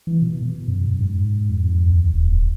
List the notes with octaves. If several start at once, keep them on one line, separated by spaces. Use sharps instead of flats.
E3
B2
B2
F#2
G#2
F2
D#2
D1